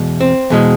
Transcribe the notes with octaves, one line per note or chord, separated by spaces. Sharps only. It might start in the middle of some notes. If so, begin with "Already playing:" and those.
Already playing: E2 B2 G#3
C4
E2 B2 G#3